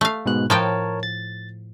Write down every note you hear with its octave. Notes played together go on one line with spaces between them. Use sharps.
A3 F5
G#2 B2 F#6
A2 F3 A#4 C#5 G5 A5
A6